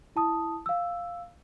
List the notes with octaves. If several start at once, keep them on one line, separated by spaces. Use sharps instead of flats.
E4 A5 D#6
F5 E6